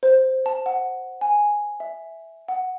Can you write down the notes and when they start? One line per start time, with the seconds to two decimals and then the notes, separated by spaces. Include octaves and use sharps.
0.03 C5
0.46 A5
0.66 F#5
1.21 G#5
1.80 E5
2.48 F#5